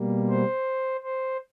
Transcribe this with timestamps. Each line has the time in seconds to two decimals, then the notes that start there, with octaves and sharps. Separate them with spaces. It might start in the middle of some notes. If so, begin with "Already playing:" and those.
Already playing: B2 G3 A#3
0.29 C5
1.03 C5